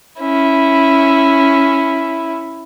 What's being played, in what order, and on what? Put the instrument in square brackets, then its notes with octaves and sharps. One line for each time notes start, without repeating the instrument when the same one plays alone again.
[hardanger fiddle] C#4 E4